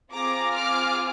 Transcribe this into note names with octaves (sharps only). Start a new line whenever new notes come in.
C4 F4 G#4 A#5 D6
D6 F6